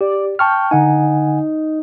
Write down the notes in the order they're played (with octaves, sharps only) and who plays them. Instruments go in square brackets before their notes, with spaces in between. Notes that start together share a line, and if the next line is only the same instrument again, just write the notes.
[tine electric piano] G4 [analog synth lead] D5
[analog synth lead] G5 [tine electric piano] A5 C#6 F6
[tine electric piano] D3 F#5 G#5 [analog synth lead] D#4